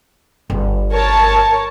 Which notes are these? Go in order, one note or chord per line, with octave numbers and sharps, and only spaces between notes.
G1
A#4 C#5 A5